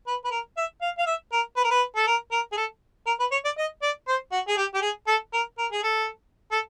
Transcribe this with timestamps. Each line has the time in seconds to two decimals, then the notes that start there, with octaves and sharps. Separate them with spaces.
0.07 B4
0.24 B4
0.31 A#4
0.57 E5
0.81 F5
0.98 F5
1.06 E5
1.32 A#4
1.56 B4
1.64 A#4
1.70 B4
1.96 A4
2.07 A#4
2.31 A#4
2.52 G#4
2.57 A4
3.06 A#4
3.19 B4
3.32 C#5
3.45 D5
3.58 D#5
3.82 D5
4.07 C5
4.32 F#4
4.48 G#4
4.57 G4
4.74 G4
4.82 G#4
5.07 A4
5.33 A#4
5.58 A#4
5.72 G#4
5.83 A4
6.51 A4